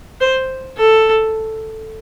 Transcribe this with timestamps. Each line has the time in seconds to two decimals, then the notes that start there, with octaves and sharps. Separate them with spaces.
0.20 C5
0.77 A4